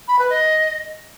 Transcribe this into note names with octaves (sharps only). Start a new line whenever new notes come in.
B5
B4
D#5